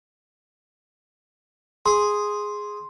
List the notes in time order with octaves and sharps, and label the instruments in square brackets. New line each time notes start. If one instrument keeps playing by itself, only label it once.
[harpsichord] G#4 [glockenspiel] C6